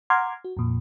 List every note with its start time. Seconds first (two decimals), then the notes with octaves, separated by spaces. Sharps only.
0.10 F#5 A#5 C6 D6 F6 G#6
0.44 F#4
0.57 F2 A#2